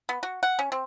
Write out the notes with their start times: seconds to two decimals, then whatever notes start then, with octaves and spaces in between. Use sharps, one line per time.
0.09 B3
0.23 F#4
0.43 F#5
0.59 C#4
0.72 C4